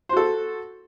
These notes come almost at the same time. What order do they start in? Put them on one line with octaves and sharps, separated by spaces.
C5 F#4 A4